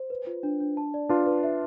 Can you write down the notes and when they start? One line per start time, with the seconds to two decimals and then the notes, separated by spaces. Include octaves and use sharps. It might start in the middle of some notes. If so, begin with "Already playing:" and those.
Already playing: C5
0.10 B4
0.27 F4
0.43 D4
0.60 D4
0.77 A5
0.94 D5
1.09 D4 F4 B4
1.26 B4
1.43 E5